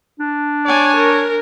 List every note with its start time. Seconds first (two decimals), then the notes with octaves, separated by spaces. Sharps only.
0.19 D4
0.66 C#5 D5 G#5
0.96 A#4